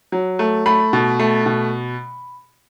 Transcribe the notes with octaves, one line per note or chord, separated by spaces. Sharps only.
F#3
A3
A3 B5
B2
A3
B2